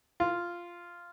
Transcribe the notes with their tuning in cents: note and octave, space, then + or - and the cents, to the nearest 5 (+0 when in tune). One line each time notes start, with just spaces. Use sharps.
F4 -5